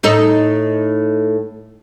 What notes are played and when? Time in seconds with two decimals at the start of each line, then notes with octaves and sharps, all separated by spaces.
0.03 A2 D#4 A4